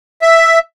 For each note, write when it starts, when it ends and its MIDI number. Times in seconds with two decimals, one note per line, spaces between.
0.22 0.59 76